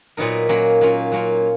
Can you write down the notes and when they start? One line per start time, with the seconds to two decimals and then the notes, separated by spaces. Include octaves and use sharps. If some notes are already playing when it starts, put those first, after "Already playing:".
0.17 A#2 F#3 B3 D#4 A#4
0.49 F#3 A#3 C#4 F4
0.81 F#3 A#3 C#4 F4
1.12 F#3 A#3 C#4 F4